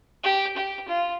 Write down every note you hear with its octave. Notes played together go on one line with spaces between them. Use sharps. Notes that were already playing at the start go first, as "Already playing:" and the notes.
G4
G4
F4